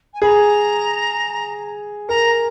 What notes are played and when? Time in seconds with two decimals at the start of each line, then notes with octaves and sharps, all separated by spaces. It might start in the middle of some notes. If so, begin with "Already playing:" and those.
0.14 G#5
0.22 G#4 B5
0.27 A#5
2.09 A#4 A#5